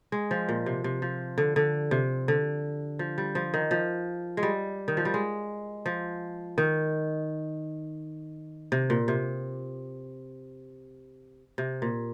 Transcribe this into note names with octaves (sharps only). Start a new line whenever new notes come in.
G#3
F3
A#2
C3
C3
F3
D3
D3
C3
D3
F3
G3
F3
D#3
F3
G#3
G3
D#3
F3
G3
G#3
F3
D#3
C3
A#2
C3
C3
A#2